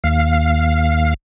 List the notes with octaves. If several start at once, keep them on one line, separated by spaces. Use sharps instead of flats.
D#2 F5